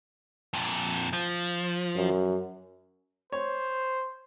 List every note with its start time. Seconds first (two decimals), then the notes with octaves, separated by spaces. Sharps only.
0.54 F2 A#2
1.13 F3
1.96 F#2
3.32 C5 C#5